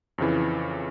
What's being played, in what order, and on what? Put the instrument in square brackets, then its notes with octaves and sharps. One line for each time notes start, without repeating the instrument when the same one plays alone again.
[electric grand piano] F2 C#3 E3